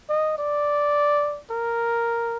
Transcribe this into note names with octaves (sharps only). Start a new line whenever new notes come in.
D#5
D5
A#4